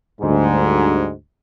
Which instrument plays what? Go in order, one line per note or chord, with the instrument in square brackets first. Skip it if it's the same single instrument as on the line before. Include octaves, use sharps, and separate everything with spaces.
[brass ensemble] D2 G#2 G3